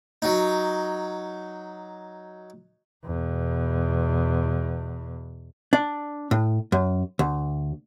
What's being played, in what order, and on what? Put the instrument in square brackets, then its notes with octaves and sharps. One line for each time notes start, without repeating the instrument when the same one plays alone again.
[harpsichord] F#3 D#4
[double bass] E2 B2
[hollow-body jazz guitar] D4
A2
F#2
D2